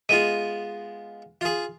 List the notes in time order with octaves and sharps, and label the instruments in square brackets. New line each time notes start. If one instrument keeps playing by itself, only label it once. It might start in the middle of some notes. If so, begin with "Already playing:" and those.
[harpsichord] G#3 B3 F4 [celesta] D#7
[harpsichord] F4 G#4